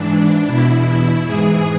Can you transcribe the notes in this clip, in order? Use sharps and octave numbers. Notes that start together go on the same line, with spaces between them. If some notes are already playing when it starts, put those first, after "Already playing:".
Already playing: G#2 E3 D4
E2 B2 E4
E4
G#2 E3 G#4